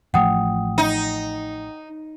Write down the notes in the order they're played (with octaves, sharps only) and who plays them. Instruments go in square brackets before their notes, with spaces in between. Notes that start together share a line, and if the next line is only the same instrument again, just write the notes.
[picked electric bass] A1 F3 A3 [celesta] F#5 G5 D#6
[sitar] D#4